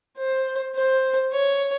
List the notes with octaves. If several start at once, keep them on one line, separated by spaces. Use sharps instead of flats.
C5
C5
C#5